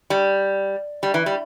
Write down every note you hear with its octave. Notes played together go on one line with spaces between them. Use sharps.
G3
G3
E3
G3